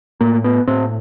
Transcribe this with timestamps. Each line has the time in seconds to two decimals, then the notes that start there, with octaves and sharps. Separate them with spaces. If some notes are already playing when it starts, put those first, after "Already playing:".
0.21 A2 A#3
0.44 B3
0.67 A2 C4